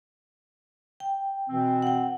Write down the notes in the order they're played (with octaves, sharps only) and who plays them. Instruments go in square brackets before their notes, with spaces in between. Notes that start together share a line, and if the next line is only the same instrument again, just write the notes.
[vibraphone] G5
[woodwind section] B2 E3 C4
[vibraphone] F#5 G5